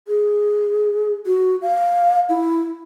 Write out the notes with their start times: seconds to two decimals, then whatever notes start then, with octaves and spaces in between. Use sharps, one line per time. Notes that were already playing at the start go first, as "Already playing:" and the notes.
0.08 G#4
1.26 F#4
1.62 F5
2.29 E4